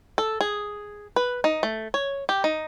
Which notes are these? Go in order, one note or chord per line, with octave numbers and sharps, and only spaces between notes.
A4
G#4
B4
D#4
A3
C#5
G4
D#4